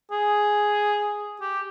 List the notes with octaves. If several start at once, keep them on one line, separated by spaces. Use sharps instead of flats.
G#4
G4